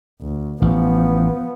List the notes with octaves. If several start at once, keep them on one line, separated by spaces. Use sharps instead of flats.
D2
A1 F3 B3